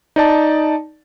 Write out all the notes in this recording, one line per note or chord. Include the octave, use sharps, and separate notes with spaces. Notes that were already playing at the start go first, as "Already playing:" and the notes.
D#4 D5 A5